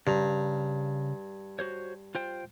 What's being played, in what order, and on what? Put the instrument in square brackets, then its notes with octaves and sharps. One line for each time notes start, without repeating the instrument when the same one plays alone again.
[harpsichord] G2 [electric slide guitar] C#3 A#5
[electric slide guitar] F#4 C5 C#5
F4 C5 G5